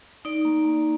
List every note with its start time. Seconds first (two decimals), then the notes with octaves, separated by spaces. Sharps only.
0.25 D#4 D5
0.45 A#3
0.65 A#3